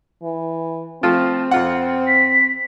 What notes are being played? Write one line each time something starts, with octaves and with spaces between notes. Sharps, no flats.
E3
F3 A3 C4 F4
F2 F4 F#5
B6